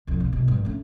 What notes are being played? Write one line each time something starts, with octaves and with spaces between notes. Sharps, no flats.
C2 F2
C2 A#2
C2 B2
A#1 G2
A3 C#4